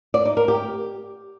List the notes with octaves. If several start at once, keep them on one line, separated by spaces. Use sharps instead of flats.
D5
D#4
A#4
G4